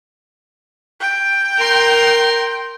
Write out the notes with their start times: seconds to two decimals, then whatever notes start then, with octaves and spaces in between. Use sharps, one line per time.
1.01 G5
1.57 A#4 C6